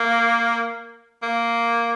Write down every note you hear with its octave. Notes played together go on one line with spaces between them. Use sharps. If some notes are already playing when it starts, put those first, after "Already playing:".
Already playing: A#3
A#3